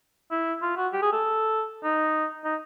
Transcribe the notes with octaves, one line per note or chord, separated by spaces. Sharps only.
E4
F4
F#4
G4
G#4
A4
D#4
D#4